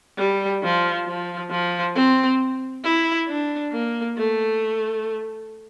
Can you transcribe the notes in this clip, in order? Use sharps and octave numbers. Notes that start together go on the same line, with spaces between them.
G3
F3
F3
F3
C4
E4
D4
A#3
A3